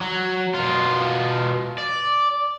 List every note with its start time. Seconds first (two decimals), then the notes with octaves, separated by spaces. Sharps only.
0.01 F#3
0.54 B2 F4
1.78 D5